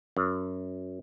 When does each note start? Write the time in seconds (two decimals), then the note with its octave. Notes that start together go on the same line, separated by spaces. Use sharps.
0.17 F#2